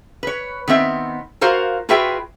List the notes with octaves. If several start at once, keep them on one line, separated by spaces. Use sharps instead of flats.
B4 C#5
D#3 B3 C4 E5
F4 F#4 A#4 C5 F5
F4 F#4 G#4 B4 E5 G5